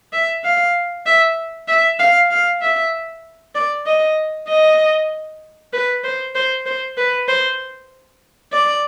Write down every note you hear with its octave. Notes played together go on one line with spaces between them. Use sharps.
E5
F5
E5
E5
F5
F5
E5
D5
D#5
D#5
B4
C5
C5
C5
B4
C5
D5